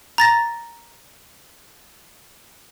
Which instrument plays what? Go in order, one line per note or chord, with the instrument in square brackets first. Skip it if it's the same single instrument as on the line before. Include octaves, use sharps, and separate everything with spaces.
[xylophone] A#5 A6 A#6